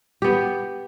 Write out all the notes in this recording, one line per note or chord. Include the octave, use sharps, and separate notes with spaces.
B3 G4